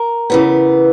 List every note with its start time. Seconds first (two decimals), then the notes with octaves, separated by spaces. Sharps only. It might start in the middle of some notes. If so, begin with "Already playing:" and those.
Already playing: A#4
0.30 C#3 E3 B3